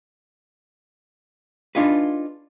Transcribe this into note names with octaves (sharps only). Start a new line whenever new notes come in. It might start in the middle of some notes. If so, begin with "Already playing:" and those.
D4 D#4 F4 G#4 B4